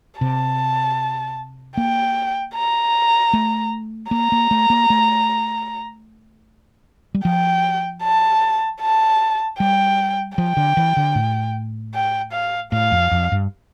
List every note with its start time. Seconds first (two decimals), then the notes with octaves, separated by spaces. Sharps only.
0.21 C3 A5
1.77 A#3 G5
2.55 A#5
3.33 A3
4.11 A#3 A#5
4.32 A#3
4.51 A3
4.70 A#3
4.90 A3
7.15 G3
7.25 F3 G5
8.03 A5
8.82 A5
9.59 G3 G5
10.38 F3 G5
10.57 D3
10.77 E3
10.97 D3
11.15 A2
11.94 G5
12.33 F5
12.72 A2 F5
12.91 F2
13.12 F2
13.32 G2